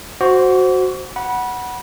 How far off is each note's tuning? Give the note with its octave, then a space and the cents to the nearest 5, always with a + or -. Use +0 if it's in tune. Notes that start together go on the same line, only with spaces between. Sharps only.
F#4 +0 C5 +0 D6 -45
F#5 +5 B5 -25